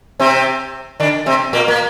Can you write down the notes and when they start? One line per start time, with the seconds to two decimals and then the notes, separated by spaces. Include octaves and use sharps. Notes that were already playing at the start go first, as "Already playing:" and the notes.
0.20 C3 C4
1.00 D3 D4
1.26 C3 C4
1.53 A#2 A#3
1.68 A#3